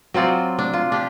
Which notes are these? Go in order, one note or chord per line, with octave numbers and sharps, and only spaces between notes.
F#3 C4 F4 D5
D4
F4
D4 G4